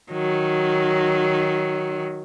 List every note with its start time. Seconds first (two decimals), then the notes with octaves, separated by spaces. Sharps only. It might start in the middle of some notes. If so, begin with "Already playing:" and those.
0.12 D#3 F#3